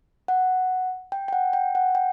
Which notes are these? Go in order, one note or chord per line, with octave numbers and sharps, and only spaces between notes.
F#5
G5
G5
F#5
G5
F#5
G5